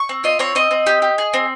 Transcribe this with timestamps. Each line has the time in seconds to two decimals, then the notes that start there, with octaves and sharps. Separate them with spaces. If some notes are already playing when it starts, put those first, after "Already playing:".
Already playing: C#6
0.09 C4
0.24 F4 D#5
0.39 C4 C#5
0.55 C4 D#5
0.71 C4
0.87 G4
1.02 G4
1.18 G#4
1.34 C4